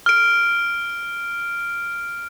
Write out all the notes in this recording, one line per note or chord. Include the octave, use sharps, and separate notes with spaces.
F6 D7